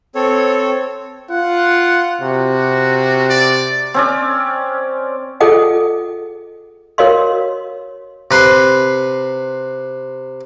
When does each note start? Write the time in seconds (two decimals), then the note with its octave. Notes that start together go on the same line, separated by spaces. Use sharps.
0.15 C4 A4 C#5
1.31 F4 F#5
2.21 C3 F#4
3.29 D5
3.94 C4 C#4 D5
5.40 F4 G#4 A4 D#5 F#5 G5
6.98 F#4 A#4 C#5 D#5 F5 C6
8.31 C3 B4 C6